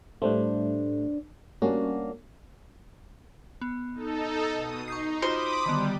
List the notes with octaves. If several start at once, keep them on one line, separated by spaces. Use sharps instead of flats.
A2 G3 A3 D4 B4 C5
G3 A#3 C#4 D4 F#4
B3
D#4 A4
B2 D#6
D#4 C#6 G6 C7
D#4 F4 F#4 C5 B5 D6 D#6
D3 D#3 G3 B3 G4